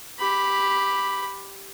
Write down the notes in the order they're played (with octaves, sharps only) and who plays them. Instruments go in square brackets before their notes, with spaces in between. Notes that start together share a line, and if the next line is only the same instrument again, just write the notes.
[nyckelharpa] G4 B5